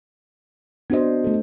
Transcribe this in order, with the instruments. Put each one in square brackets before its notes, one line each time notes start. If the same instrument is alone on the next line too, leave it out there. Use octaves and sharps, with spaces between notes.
[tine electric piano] B3 F#4 D#5 [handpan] D4 C5
[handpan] A3 A4